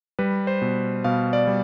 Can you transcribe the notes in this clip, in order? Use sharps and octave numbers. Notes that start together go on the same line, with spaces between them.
G3 B4
C5
B2
B2 F5
D5
G3